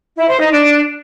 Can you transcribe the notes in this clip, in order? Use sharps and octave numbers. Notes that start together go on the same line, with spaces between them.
E4
C5
D#4
D4